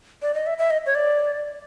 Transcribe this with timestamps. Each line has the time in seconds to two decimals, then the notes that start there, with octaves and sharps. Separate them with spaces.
0.22 D5
0.34 D#5
0.47 E5
0.58 E5
0.70 D#5
0.86 C#5
0.95 D5